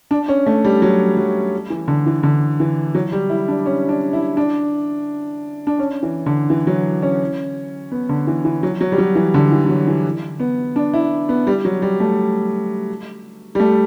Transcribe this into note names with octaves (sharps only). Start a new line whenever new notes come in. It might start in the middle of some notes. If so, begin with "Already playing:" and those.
D4
C#4
A3
G3
F#3
F#3
E3
D3
E3
D3
E3
F#3
G3
E4
D4
C#4
D4
E4
D4
D4
C#4
E3
D3
E3
F#3
C#4
B3
D3
E3
E3
F#3
F#3
G3
F#3
E3
D3
E3
E3
F#3
E3
B3
D4
E4
B3
G3
F#3
G3
A3
G3
A3